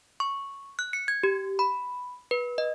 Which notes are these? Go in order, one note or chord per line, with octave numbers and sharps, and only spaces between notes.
C#6
F#6
C#7
G#6
G4
B5
B4
D#5